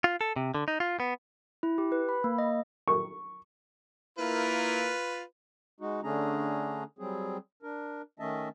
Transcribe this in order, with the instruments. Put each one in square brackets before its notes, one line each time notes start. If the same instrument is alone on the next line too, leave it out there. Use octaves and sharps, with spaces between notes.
[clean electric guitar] F4
A4
C3
D3
D#4
F4
B3
[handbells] E4
G4
B4
B5
A#3
D#5
[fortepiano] C#6
[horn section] A#3 E4 A#4 [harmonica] F4 B4
[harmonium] G#3 D#4 F#4
D3 A3 C#4 D4 G#4 A#5
F#3 G3 C4 G#4
D4 A#4
D#3 A3 C#4 D#5 E5 A5